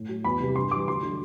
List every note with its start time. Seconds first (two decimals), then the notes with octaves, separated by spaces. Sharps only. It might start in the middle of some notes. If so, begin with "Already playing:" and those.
Already playing: A2
0.09 F#3
0.24 E2 B5
0.40 C3 E3 G3
0.56 G2 C6
0.71 E3 G3 D6
0.88 D2 C6
1.03 D3 F#3